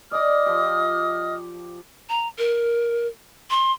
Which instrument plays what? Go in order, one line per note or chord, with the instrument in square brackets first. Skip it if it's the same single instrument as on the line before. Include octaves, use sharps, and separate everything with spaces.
[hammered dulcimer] D5 D6 [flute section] D#5 D#6 F6
[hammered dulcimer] F3 G4
[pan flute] A#5
A#4
C6